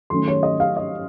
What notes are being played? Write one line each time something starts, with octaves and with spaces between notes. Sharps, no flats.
D#3 F#3 A3 C#4 C6
C#5
D#5
F5
D#5